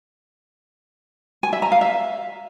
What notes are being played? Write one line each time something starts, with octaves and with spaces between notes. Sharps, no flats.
G#5
E5
A#5
F5
E5